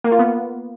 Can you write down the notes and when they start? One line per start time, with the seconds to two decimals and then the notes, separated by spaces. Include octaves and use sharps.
0.04 A#3
0.12 F4
0.19 B3